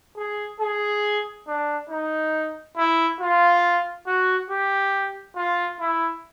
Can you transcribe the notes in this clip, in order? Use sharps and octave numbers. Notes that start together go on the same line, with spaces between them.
G#4
G#4
D4
D#4
E4
F4
F#4
G4
F4
E4